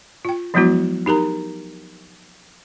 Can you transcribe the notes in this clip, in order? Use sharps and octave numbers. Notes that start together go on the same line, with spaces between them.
F4 G5
F3 F#3 G#3 B3 E4 F#4
D#4 G4 A#4 A#5